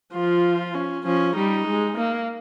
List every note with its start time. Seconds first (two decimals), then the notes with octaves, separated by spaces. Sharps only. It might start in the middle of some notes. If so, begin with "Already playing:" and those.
0.14 F3 F4
0.74 C#4
1.05 F3 C#4
1.36 G3 D#4
1.67 G#3
1.97 A#3